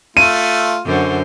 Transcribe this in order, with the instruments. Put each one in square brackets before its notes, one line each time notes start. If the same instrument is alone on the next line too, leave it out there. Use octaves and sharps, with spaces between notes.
[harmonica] A3 F4 [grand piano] D#7
[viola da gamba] F#2 D3 C5